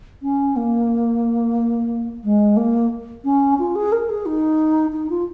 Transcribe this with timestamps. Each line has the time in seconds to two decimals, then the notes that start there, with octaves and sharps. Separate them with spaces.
0.22 C#4
0.56 A#3
2.24 G#3
2.56 A#3
3.24 C#4
3.59 F4
3.75 G#4
3.92 A#4
4.09 G#4
4.26 D#4
4.92 D#4
5.10 F4